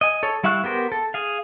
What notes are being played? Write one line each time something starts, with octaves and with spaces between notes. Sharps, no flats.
D#5 G#5
A4 C#5
G3 E4 F5 C#6 F#6
B3 G4 A#4 C5
A4
G#4 F5